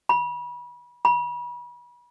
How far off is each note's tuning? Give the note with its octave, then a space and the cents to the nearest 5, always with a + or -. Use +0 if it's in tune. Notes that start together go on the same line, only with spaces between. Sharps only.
B5 -30
B5 -35